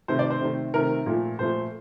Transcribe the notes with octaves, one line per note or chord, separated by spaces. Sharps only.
C3 D#3 A3 C5
D5
C5
C3 D#3 A3
C3 D#3 A3 A#4
A#2 F3 A3
A#2 F3 A3 C5